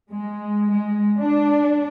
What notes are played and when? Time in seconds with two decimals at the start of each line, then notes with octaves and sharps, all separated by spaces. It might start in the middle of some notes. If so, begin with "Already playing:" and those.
0.12 G#3
0.72 G#3
1.21 D4